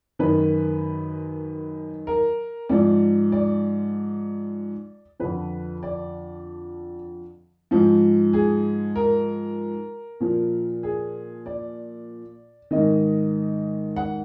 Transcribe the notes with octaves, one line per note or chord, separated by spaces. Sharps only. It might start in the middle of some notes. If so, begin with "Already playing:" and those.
F#2 D#3 B4
A#4
G#2 F3 D5
D5
F2 D3 F3 B4
D5
G#2 F3
G#4
A#4
A#2 F3
G#4
D5
G#2 D#3 D#5
F#5